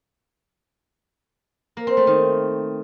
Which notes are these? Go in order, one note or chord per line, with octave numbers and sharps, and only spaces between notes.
A#3
C4
A3
D#3